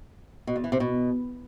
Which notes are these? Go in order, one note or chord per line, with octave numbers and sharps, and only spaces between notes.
B2
E2
E3
C3
B2